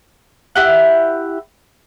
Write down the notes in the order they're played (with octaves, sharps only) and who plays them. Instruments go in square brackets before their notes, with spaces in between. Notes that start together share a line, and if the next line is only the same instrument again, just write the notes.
[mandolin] E4 G4 F#5